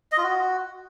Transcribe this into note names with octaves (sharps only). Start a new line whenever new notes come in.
D#5
F4
F#4